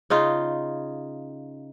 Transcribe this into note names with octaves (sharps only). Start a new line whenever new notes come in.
C#3 D#4 F4